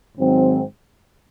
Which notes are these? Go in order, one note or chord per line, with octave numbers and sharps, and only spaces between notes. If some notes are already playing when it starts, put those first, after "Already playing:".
G#2 D#3 F#3 C4